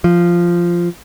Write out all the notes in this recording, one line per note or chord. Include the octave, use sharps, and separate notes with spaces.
F3